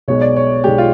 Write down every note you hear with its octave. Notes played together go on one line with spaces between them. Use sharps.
B1 B2 G#3 C#5
D5
C#5
B1 B2 G#3 G4
F4